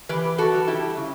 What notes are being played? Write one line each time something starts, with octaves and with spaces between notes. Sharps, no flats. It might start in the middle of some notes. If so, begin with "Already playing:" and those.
E3 G4 B4
F#4 A4
G3
E4 G4
C#3